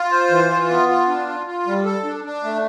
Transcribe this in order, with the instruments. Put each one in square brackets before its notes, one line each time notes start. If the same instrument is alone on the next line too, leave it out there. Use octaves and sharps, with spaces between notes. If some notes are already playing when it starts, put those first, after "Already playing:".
Already playing: [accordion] F4
C5
E3
F4
B3
F4
D4
F4
F4
G3
A4
D4
D4
A3